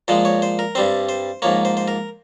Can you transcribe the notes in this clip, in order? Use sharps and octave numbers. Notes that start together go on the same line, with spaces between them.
A#2 F3 G#3 C5
C#5
C5
A#4
G2 G3 C4 C5
C5
G#2 F3 A#3 C#5
C5
C5
A#4